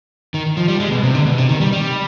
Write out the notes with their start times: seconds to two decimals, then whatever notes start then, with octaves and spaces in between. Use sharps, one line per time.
0.34 D#3
0.57 F3
0.68 G3
0.80 G#3
0.91 B2
1.03 C3
1.15 D3
1.26 B2
1.38 C3
1.49 D#3
1.61 G3
1.73 G3